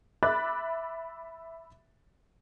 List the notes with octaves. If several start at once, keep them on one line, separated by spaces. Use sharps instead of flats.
E5 B5 D6 F#6 A6